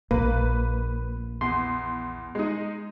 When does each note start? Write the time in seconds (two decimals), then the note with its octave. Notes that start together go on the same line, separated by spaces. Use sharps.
0.11 A#1 A#3 B4
1.41 E2 C6
2.35 G#3 D#4